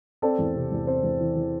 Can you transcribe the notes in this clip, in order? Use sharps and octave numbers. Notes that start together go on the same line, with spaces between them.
C4 A4 D5
E2
C3
E2
C4 C5
E2
E3
E3